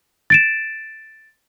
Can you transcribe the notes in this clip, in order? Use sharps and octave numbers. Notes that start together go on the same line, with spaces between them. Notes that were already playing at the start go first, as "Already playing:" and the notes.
A6 D7 E7